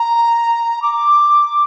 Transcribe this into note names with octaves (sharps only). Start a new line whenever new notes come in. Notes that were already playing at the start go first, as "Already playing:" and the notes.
Already playing: A#5
D6